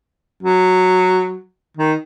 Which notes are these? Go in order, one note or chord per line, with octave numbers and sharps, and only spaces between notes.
F#3
D#3